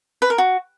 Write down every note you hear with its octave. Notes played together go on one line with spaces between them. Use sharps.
B4
A#4
F#4